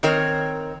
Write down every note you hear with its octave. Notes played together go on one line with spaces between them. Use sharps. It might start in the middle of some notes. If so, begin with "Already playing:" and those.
D#3 C4 A#4 C#5